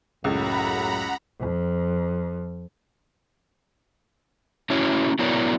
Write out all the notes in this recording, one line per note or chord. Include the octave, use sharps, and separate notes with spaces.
C#2 F#2 A2 F#5 A#5 B5
F2
A3 C#4 E4 F#4 C#5
F#3 B3 E4 A#4 C#5 D5